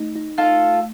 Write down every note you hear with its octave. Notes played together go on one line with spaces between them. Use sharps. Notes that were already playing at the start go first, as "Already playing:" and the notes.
Already playing: A3 D#4
D#4
D#4 F4 A4